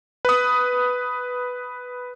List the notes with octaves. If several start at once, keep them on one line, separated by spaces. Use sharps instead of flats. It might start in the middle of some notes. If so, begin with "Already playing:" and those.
B4 D#6